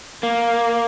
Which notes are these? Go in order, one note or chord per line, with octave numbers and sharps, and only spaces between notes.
A#3